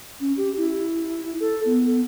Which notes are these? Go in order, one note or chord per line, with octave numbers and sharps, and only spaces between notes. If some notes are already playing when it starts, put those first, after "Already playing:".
C#4
G4
E4
A4
B3